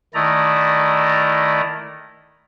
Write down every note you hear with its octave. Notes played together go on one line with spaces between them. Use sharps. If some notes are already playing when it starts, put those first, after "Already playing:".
D#3 A3 E4 D5 D#5 A#5